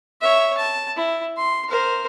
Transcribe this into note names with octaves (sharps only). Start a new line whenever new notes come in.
C#5 E5
A5
E4
C6
A#4 C5